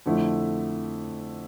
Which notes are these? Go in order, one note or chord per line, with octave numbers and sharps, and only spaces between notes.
F2 D3 A3 E4